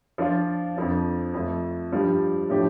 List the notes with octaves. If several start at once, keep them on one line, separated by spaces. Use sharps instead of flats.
F3 D4 F4
F2 F3 D4
F2 F3 A3
G2 F3 D4 G4
A2 F3 D4 G4